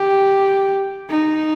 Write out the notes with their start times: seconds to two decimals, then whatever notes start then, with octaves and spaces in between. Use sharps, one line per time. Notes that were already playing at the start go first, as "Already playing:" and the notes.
Already playing: G4
1.10 D#4